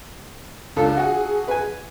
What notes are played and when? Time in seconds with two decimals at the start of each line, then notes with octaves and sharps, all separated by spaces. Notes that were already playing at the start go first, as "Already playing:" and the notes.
0.76 C#2 D4 A4
0.97 F#4 G#4
1.48 B4 G#5